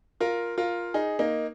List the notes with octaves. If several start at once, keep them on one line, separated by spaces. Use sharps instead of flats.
F4 A#4
F4 A#4
D#4 G#4
A#3 D#4